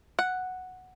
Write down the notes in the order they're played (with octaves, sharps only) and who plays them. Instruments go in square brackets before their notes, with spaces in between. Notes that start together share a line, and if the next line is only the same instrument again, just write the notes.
[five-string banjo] F#5